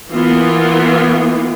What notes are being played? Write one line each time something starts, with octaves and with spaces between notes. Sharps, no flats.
E3 A#3 B3 F4